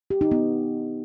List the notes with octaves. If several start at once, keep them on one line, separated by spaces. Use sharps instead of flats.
G4
D#4
B3